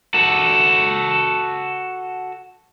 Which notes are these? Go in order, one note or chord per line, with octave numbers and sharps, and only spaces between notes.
F#4 A4